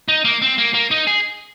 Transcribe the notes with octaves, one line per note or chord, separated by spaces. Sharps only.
D#4
A#3
C4
A#3
A#3
D#4
G#4